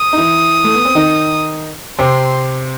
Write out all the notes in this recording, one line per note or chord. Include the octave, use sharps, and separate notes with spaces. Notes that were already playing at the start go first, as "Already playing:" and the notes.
Already playing: D#6
D#4
E3 E4
A3
B3
C4
D#3 D#4
C3 C4 C6